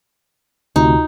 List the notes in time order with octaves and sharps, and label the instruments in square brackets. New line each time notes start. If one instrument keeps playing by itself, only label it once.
[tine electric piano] D2 C3 [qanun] D#4 [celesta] F4 F#4 A#5